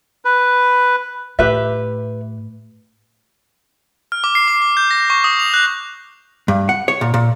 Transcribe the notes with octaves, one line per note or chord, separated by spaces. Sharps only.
B4
A2 G4 B4 E5
F6
D6
C7
D6
D6
G6
A#6
C#6
D#6
F7
F#6
G2
F#5
C#5
A#2
A#2